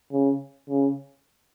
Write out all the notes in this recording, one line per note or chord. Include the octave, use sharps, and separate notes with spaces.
C#3
C#3